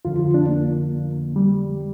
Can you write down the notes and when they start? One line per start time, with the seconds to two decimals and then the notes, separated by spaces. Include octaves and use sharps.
0.05 F2 D3 F3 F4
0.20 F4
0.34 D4
0.49 A#3
1.36 G3